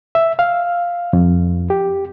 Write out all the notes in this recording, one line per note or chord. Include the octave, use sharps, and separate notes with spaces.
E5
F5
F2
G4